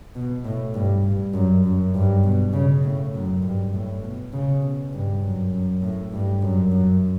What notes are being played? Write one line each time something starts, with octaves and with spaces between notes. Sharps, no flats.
B2
A2
G2
G2
F#2
F#2
G2
B2
C#3
A2
F#2
G2
A2
B2
C#3
B2
G2
F#2
F#2
A2
G2
F#2
F#2